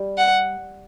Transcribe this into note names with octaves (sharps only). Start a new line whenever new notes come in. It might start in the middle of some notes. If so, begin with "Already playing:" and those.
Already playing: G3
F#5